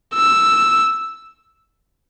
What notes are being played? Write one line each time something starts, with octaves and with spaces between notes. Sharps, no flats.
E6